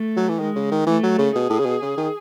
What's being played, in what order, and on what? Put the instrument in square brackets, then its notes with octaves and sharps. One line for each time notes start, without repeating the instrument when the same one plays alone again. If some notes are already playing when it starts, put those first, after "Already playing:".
Already playing: [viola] A3
[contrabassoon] F#3
E3
[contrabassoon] D#3 [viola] G#3
[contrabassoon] C#3
D#3
[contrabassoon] E3 [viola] A3
[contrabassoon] F#3
C#3
[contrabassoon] B2 [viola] G#4
[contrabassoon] A2
C#3
B2
C#3
D#3